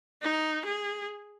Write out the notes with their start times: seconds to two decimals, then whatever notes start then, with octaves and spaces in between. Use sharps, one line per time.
0.22 D#4
0.65 G#4